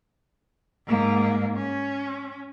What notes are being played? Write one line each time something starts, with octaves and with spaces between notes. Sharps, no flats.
G#2 A#3
C#4